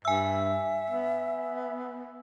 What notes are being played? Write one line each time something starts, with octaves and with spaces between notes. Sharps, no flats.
G2 E5 G#5 E6
B3